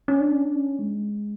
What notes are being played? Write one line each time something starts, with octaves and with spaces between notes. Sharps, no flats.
C#4
D4
C#4
D4
C#4
G#3